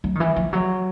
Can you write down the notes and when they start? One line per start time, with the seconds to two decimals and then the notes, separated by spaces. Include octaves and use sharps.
0.04 F#3
0.15 D#3
0.20 E3
0.36 F3
0.53 F#3